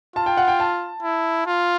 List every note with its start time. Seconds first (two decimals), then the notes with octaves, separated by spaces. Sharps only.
0.16 F4 A5
0.26 G5
0.37 F#5
0.48 G5
0.60 A5
1.02 E4
1.46 F4